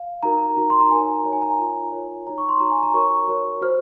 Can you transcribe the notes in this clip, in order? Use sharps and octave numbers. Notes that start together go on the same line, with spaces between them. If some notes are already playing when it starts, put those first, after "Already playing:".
Already playing: F5
D#4 F#4 A#4 A#5
D#4 F#4 A#4
C6
A#5
D#4 A#4 C#5 G#5
D#4 A#4 C#5 A#5
G#5
A#5
G#5
F4 A#4 C#5
F4 A#4 C#5
D#4 F#4 C#5 A#5
C#6
C6
D#4 F#4 C#5 A#5
G#5
A#5
F#4 A#4 C#5 C#6
F#4 A#4 C#5
F#4 C5 F6